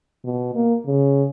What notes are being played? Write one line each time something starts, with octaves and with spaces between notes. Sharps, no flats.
B2
A#3
C#3